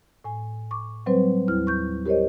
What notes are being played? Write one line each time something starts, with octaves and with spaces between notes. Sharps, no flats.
A2 G#5
C#6 D6
F#3 G3 C4 B4 C5
D#2 E4 F6
C#6 G6
G4 A#4 C5 C#5 D#5